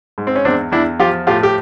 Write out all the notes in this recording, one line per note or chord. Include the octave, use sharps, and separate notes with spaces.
G#2
C4
C#4
E2 C4 D4
E2 D4 E4
F3 F4 G4
A2 F4 G4
G4